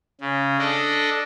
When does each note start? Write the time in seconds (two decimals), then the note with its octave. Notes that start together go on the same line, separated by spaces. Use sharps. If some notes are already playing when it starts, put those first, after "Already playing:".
0.21 C#3
0.59 D4 A4 D#5